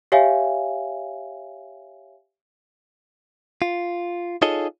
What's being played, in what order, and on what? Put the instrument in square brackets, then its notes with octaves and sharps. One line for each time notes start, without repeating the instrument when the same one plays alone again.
[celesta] G4 C#5 E5 F5 G#5
[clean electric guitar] F4
D#4 F4 G#4 A4 C#5 D#5